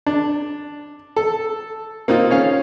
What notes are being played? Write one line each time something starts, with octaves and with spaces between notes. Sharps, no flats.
D4
A4
A#3 C4 D#4 F4
C#4 C#5 F5